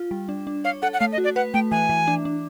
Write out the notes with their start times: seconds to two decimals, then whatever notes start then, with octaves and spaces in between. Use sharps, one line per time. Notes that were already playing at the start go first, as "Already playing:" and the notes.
Already playing: F4
0.11 G3
0.29 D4
0.47 D4
0.64 C#5 F5
0.82 A4 F#5
0.94 F#5
1.00 A3 F5
1.12 D#5
1.18 F#4
1.24 D5
1.36 B4 F#5
1.54 A3 G5
1.71 E3 G#5
1.89 E3
2.08 D4
2.25 D4